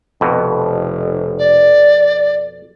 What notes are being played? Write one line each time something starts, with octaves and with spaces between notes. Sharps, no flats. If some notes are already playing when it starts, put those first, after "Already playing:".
F1 F2 B2
D5